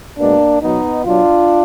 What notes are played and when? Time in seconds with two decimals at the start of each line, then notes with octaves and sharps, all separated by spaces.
0.19 B2 G#3 A#3 D4
0.62 B2 F#3 B3 D#4
1.05 B2 F#3 D4 F4